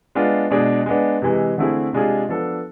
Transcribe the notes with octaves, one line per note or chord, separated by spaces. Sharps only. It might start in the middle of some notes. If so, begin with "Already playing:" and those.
G#3 B3 D4 F4
B2 G#3 D4 G#4
G#3 B3 D4
C3 E3 G#3
D3 A3 C4 E4 G#4
C3 G#3 D4 F4 G#4
F3 B3 D4 A4